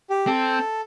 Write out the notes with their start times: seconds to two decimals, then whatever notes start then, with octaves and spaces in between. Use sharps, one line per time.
0.10 G4
0.27 C4 A4